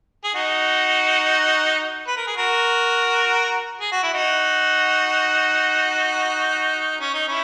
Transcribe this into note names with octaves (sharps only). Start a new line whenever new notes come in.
G#4
D#4 F#4
B4
A#4
G#4
F#4 A#4
G#4
F#4
E4
D#4 F#4
C#4
D#4
C#4 E4